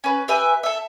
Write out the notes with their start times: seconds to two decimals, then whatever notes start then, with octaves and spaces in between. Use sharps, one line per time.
0.04 C#4 B4
0.28 G4 B4 E5 G#5
0.63 A4 E5